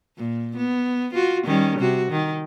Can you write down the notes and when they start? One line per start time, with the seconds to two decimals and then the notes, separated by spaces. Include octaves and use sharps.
0.17 A#2
0.57 B3
1.14 F4 F#4
1.45 D#3 G3 C#4
1.79 C3 F#4
2.11 D#3